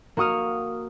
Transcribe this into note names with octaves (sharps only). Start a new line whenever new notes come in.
A#3 F#4 C#6 D#6 F6